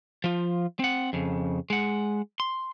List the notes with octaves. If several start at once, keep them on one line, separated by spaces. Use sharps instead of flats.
F3 F4
C4 F#5
F2 C#3
G#3 F#5
C6